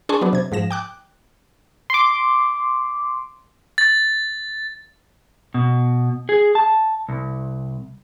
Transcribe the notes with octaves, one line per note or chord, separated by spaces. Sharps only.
D4 G#4 G#5 A5 C6 C#6
F#3 B3 D4
C3 G#6
G#2 F3 A#6 E7
G5 D6 F#6
C6 D6
A6
B2
G#4
A5
C2